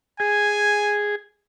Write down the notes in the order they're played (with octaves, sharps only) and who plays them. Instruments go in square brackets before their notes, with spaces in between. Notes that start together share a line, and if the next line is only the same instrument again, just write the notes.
[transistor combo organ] G#4 [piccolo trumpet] G#5